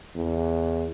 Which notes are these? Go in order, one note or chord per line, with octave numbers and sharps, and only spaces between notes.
E2